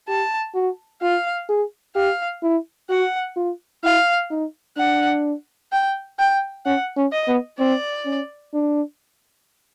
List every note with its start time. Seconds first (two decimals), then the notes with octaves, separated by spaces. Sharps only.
0.08 G4 A5
0.55 F#4
1.02 F4 F5
1.49 G#4
1.95 G4 F5
2.43 E4
2.90 F#4 F#5
3.36 F4
3.84 E4 F5
4.30 D#4
4.77 D4 F#5
5.72 G5
6.19 G5
6.65 C#4 F#5
6.97 C#4
7.12 D#5
7.28 B3
7.59 C4 D5
8.06 C#4
8.53 D4